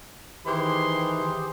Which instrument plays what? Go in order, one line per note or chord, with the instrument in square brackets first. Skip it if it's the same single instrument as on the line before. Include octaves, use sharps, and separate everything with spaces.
[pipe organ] D#3 [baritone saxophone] E3 [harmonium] G4 G#4 C5 [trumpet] C6